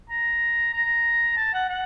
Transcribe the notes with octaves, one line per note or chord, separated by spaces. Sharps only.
A#5
A#5
A5
F#5
F#5